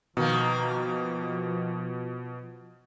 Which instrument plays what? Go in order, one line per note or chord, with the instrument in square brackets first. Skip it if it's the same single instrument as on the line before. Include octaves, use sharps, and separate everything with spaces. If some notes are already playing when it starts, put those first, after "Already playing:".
[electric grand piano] B2 [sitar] D#3 A#3 [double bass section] F3